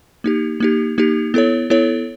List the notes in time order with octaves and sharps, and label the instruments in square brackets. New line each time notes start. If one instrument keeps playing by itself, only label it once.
[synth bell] A#3 D#4 G4
A#3 D#4 G4
A#3 D#4 G4
B3 E4 A4 C#5
B3 E4 A4 C#5